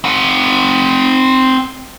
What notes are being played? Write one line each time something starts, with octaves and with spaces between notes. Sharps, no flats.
C4 F#5